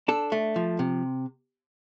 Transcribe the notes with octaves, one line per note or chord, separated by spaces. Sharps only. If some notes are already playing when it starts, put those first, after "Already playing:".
D4 A4
A3
F3
C3